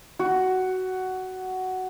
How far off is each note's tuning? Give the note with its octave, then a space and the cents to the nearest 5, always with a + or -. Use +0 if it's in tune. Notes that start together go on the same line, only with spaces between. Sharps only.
F#4 +10